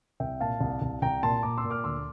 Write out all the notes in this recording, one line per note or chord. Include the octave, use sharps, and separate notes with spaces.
C2 E5 G5
A#2 F5 A5
C2
C2
C2 G5 A#5
A#2 A5 C6
A#2 A#5 D6
C6 E6
A#2
D6 F6
D2 C6 E6